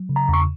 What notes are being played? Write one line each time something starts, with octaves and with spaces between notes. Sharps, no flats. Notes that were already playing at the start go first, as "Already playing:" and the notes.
Already playing: F#3
C#3
A#5
E2 C#6